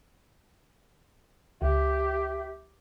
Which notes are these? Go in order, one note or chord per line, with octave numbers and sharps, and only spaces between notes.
C#2 G4 E5